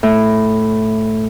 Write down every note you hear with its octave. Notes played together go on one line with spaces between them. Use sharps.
A2